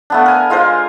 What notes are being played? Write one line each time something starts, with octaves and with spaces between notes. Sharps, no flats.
A3 B3 D4
A#4 G#5
G#3 F4 A#4 C5